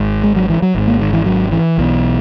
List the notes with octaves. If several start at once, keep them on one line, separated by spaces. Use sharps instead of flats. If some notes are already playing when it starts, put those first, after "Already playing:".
Already playing: G#1 G#2
G#3
F#3
E3
F#3
G#1 G#2
A#3
D#3
E3
F#3
E3
B1 B2